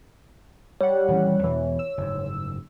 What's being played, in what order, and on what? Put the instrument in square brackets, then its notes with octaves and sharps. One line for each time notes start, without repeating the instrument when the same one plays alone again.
[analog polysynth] G3 F#5 [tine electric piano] C#5
[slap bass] D#1 E3 C#4
[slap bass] E2 B2 [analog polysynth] E3
[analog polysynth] E6
[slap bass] F#1 G#2